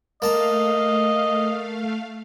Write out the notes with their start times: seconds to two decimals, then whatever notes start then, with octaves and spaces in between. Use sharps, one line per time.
0.22 A3 A#3 D#5 F5 A5 A#5